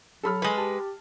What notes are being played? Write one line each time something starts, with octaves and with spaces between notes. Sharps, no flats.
F#3 A4 B5 F6
G#3 B4
G4 A5